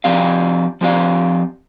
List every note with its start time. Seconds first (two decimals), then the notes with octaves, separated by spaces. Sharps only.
0.04 F3 C4 G4 D5 F5
0.81 F3 C4 G4 D5 F5